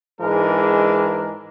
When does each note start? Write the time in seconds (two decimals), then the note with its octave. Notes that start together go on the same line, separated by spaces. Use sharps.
0.21 G#2 E3 G#3 D4 A#4